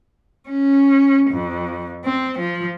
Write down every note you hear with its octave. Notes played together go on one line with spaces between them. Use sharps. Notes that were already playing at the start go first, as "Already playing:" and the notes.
C#4
F2
C4
F3